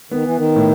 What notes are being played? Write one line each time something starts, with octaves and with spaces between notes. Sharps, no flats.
D#3 B3
E3
D#3
A2